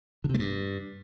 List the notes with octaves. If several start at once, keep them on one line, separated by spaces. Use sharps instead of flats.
D3
C3
A3
G2